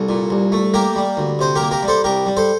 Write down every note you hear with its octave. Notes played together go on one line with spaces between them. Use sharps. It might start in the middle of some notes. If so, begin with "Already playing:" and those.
Already playing: C2 A4
A#2
C2
A3
A#3 G4 A#4
G3
D2
C3 C5
G4 A#4
A#3
G4 A#4
G3
A4 C5
C2 G4 A#4
G3
A4 C5